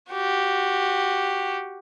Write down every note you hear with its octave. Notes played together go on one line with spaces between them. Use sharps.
F#4 G4